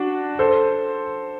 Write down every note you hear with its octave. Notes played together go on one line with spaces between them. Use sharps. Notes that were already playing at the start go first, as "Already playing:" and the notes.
Already playing: D4 F#4
A4 C5